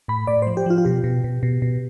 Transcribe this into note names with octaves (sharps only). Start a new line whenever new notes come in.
A2 B5
A2 D5
F3 C5
G4
F3 F4
F4
B2 G4
B2
B2
B2
B2